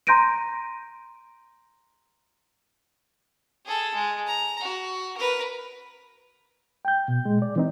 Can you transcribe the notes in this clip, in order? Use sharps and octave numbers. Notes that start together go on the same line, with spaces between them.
A#5 C6 G6 A#6 D7 D#7
G#4 A4
G#3
A#5
F#4
A#4 B4
G5 G6
B2
A#2 G#3
D5
E3 C4 D#4